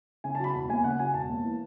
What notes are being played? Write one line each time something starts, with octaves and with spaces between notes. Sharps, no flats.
C#3 G#5
A5
F#3 B5
E1 B5
D#2 G#5
C#3 F#5
F#3 G#5
E1 A5
D#2
E3